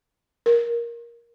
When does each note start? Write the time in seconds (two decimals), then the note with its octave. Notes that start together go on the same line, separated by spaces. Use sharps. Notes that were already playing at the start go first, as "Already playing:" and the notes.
0.46 A#4